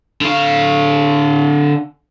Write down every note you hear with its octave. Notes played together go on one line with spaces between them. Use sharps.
D3 F5